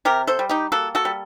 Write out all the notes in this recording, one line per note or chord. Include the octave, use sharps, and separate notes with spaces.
C3 G4 A#4
A4 C5
G3
D#4 G4
A#3 F#4 A4
F#4 A4
G3